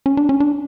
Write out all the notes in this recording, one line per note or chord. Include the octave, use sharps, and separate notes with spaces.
C#4
D4
C#4
D4